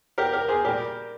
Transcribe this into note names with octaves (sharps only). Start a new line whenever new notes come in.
G4 A#4
G4 A#4
G#4 C5
A#2 G3 A#3 G4 A#4